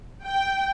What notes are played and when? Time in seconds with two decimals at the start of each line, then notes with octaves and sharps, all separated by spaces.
0.24 G5